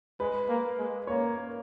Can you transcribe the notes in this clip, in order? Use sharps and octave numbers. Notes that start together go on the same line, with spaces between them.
G#3 B4
A#3
G#3
A#3 C#5